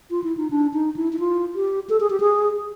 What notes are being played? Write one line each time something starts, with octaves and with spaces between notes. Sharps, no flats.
F4
E4
D#4
D4
D#4
E4
E4
F4
G4
A4
G#4
G4
G#4